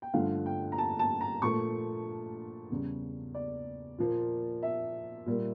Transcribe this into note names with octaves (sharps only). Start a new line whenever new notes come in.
G5
G2 D3 F3 A3 F5
G5
A#5
A5
A5
A#5
A#2 F3 A3 C#6
E2 C#3 G3
D5
A#2 F3 A#3
E5
A#2 G3 A#3